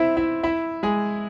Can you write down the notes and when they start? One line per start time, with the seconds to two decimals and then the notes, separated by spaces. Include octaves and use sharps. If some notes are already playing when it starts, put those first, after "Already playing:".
Already playing: C4 E4 E5
0.17 E4 E5
0.43 E4 E5
0.83 G#3 G#4